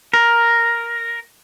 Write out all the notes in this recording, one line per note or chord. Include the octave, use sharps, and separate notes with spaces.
A#4